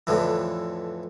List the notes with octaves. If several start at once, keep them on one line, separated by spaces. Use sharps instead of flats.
F2 A2 D3 E3